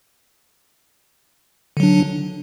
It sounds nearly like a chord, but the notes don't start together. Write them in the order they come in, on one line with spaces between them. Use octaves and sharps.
D3 F#3 D4